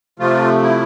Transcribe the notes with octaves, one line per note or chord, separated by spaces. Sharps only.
C3 F3 A3 F4
E4